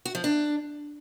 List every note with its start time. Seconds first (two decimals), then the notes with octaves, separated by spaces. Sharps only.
0.05 F#4
0.15 F3
0.24 D4